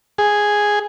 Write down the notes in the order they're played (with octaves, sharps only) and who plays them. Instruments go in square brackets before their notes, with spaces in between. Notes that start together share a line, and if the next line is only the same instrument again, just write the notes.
[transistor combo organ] G#4